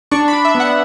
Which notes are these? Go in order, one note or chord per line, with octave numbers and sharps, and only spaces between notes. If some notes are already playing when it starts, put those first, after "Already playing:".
D4 C#6
B5
D4
E5
B3
F#5